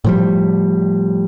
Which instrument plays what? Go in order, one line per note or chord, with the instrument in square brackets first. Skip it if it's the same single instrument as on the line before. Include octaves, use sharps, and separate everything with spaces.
[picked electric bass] A2 F3 G3